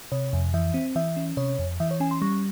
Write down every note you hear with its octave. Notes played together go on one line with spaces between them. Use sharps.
C3 C#5
F2
E3 E5
C4
E3 E5
C#4
C3 C#5
F2
E3 E5
C#5
C#4 G#5
C6
G3 C#6